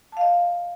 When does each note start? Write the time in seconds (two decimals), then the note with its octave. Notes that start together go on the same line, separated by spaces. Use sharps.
0.12 A5
0.17 F5
0.21 D#5